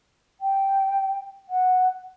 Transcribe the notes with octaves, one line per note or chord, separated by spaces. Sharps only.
G5
F#5